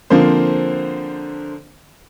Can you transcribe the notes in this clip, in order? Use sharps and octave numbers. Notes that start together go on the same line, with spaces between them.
D3 F3 A#3 C4 C5